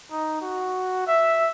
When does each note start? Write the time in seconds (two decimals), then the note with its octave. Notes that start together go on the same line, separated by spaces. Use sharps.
0.11 D#4
0.41 F#4
1.07 E5